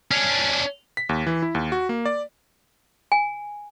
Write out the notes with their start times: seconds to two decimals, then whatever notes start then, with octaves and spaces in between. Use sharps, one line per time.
0.11 C#4 D4
0.97 B6
1.09 D#2
1.27 E3
1.42 E4
1.55 D#2
1.72 F#4
1.89 A#3
2.05 D5
3.12 G#5